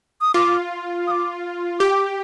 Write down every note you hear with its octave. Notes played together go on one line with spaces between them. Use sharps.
D#6
F4 D6
D#6
D6
G4 D6